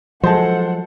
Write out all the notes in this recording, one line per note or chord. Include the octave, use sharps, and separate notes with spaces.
F3 F#3 G#3 A4 C5 F#5 A5